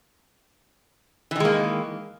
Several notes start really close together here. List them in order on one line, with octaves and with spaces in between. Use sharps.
E3 D#3 G#3 A#3